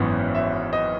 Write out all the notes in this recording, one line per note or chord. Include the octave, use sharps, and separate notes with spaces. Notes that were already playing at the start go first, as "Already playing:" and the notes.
Already playing: G#1 F#2 E3 B3
E5
D#5